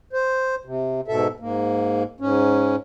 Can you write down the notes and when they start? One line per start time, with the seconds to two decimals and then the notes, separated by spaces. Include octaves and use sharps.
0.13 C5
0.65 C3
1.08 G#2 B2 A4 E5
1.40 G#2 A#3
2.20 G#2 C#4